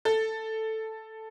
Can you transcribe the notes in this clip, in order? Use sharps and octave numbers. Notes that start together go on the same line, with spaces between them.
A4